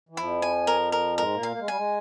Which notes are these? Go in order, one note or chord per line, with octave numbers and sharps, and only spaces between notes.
E3
F2 F3 E4
G#5
A#4
A#4
G#2 G#3 A#4
A#2 A#3
F5
A#3
G#3
G3 G#5
G#3